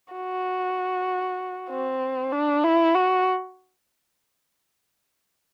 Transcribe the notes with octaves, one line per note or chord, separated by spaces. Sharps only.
F#4
C4
D4
E4
F#4